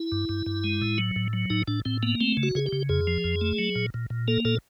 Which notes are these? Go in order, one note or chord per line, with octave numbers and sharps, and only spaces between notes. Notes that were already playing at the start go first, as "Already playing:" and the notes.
Already playing: E4
G2
G2
G2
G#3
A2
F#3
A2
F#3
A2 D#4
A2 D4
A2 C4
A#3 B3
A3 C4
C#3
F#4
C#3 G#4
G4
C#3
F2 G#4
F3
F2
A3
F#3
A#2
A#2
A#2
A#3 A4
A#2 A4